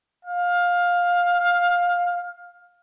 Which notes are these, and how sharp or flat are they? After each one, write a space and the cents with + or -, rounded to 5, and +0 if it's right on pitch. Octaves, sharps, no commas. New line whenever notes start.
F5 +15